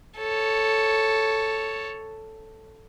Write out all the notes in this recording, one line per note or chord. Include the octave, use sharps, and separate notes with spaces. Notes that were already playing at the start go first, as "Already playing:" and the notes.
A4 C#5